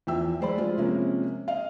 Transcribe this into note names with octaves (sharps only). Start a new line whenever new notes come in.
E2 F3 E5 G5 E6
F#3 G#3 C5 D5 B5
F3 G#3 F4
C3 F3 G#3 A#3 C#4
D#5 F5